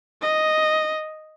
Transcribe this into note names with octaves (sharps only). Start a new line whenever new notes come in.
D#5